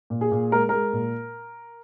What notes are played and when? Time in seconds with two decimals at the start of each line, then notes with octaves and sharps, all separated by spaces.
0.10 A#2
0.21 G#4
0.31 A#2
0.52 G#3 A#4
0.69 G#3 A#4
0.93 A#2